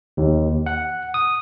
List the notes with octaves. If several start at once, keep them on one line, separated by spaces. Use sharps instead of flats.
D#2
F#5
D#6